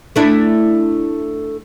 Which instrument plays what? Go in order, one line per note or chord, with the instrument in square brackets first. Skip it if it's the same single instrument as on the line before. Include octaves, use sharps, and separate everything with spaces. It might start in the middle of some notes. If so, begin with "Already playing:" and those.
[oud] A3 D4 E4